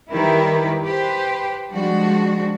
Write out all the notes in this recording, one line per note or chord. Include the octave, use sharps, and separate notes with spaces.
D#3 G3 E4 G4 A#4 B4
G4 B4 C5
F3 G3 G#3 D4 F#4